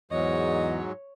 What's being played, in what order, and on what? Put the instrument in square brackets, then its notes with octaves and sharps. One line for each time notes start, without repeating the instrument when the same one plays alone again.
[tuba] E2 [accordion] G#2 F#3 [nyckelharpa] C#5 [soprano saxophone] D#5